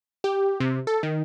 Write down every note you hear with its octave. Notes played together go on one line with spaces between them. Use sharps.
G4
C3
A4
D#3